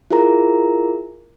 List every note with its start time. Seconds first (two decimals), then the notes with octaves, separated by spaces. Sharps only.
0.11 E4 F4 G#4 A#4 A#5